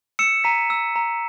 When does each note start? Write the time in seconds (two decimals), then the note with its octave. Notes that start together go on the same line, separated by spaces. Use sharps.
0.19 E6 C#7 E7
0.44 A#5 B6 D#7
0.70 E6
0.96 A#5